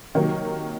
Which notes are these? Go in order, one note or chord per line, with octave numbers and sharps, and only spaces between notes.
C3 D#3 F#3 A#3 C#5